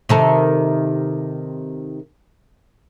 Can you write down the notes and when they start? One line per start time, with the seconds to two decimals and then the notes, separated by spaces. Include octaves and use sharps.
0.09 C3 D#3 A4